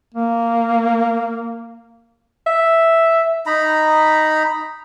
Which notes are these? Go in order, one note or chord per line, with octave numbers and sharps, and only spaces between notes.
A#3
E5
D#4 A#5 B5